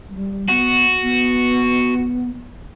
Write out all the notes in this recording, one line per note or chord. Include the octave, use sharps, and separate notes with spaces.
G3
B3 F#4
B3